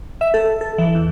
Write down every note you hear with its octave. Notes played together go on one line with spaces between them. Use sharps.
E5
A4
A4
E3
E2